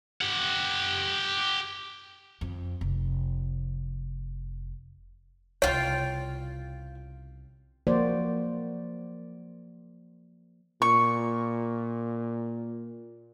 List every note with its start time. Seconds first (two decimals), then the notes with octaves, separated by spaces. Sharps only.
0.21 G4 F#5
2.41 F2
2.81 F1
5.62 C2 C#3 F4 C#5 G5
7.87 F3 A#3 F#4 C5 D5
10.82 A#2 C#6